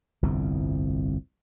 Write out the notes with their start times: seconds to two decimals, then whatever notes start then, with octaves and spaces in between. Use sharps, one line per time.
0.22 G1 C2 F2